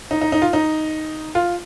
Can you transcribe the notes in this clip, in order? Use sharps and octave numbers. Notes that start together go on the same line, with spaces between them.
D#4
D#4
D#4
F4
D#4
F4